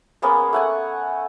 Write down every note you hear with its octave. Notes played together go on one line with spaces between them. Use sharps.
G#3 A#3 B3 C#4
A3 F#5 G#5